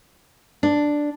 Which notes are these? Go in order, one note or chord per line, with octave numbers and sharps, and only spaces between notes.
D4